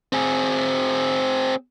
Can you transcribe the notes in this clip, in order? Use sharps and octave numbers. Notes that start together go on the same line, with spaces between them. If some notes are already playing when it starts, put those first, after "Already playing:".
C4 G#4